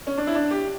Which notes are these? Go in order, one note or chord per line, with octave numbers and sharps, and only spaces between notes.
C#4
D4
E4
D4
G4